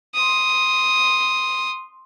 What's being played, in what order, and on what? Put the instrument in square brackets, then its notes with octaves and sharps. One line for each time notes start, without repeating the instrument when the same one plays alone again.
[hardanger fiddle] C6 D#6